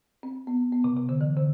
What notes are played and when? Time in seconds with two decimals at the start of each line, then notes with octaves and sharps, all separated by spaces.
0.23 C4
0.47 B3
0.72 B3
0.84 C3
0.97 C3
1.09 D3
1.21 E3
1.37 D3